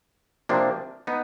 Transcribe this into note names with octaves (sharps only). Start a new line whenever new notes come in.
C3 F3 A#3 D4
B3 D#4